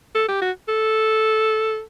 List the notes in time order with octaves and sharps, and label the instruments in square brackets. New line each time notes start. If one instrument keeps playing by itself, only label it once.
[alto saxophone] A4
G4
F#4
A4